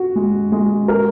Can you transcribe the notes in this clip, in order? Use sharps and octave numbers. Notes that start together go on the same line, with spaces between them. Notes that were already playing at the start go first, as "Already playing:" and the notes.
Already playing: F#4
G#3
G#3
A#4